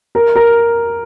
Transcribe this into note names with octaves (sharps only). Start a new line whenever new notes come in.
A#4
A#4